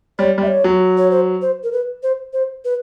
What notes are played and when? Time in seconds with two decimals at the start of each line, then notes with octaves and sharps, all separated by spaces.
0.19 G3 C#5
0.38 G3
0.43 E5
0.47 C#5
0.64 F#3
0.97 C#5
1.11 C5
1.42 C5
1.64 A#4
1.72 B4
2.03 C5
2.33 C5
2.65 B4